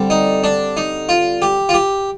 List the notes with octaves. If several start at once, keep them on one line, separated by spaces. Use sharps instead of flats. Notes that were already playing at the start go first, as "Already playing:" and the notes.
Already playing: D3 G3 C4
D#4
D4
D#4
F4
G4
F4
G4